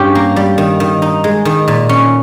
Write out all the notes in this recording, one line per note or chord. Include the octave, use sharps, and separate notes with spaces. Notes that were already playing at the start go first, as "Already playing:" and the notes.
Already playing: G2 C#4 F4 G4
A#3
G3
D#3
D#3
D#4
G#3
D#3
A#2
C#4